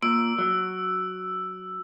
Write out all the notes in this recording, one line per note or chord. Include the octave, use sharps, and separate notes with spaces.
A#2 E6 D7
F#3